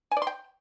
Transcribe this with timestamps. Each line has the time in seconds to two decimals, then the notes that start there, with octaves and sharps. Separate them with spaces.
0.11 G#5
0.17 D5
0.22 C6
0.27 G5